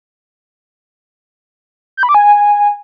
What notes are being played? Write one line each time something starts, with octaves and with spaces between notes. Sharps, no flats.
G6
B5
D6
G#5